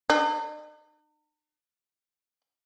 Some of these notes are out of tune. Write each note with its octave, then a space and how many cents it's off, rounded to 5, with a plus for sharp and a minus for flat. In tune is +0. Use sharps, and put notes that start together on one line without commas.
D#4 -45